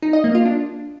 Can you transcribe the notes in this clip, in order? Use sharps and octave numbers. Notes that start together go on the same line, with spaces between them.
D#4
D#5
A#3
F4
D4